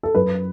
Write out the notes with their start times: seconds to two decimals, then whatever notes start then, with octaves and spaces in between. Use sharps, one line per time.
0.03 A4
0.15 F#2 B4